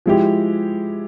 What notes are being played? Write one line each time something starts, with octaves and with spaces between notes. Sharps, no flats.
F3 G#3 E4 G4